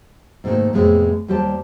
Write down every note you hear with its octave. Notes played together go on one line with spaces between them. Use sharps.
G#2 C3 D#3 F3 A3 A#3
F2 A2 C3 G#3 B3
D#2 G3 G4 C5 A5